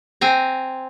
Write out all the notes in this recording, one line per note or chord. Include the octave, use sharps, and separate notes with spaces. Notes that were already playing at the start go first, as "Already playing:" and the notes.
C4 G#5 A#5